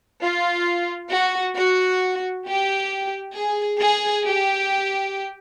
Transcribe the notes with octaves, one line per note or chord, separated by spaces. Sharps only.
F4
F#4
F#4
G4
G#4
G#4
G4